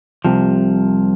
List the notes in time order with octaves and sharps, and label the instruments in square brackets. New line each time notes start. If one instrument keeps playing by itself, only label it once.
[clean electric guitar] C2 C3 F3